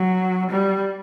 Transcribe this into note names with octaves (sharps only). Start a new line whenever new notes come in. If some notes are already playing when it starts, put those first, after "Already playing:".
Already playing: F#3
G3